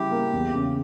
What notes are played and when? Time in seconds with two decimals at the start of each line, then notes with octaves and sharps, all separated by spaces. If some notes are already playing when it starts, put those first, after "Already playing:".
Already playing: C#3 G3 E4 G4
0.11 A#3
0.33 E2
0.55 C#3